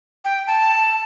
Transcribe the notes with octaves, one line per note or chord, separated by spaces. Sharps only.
G5
A5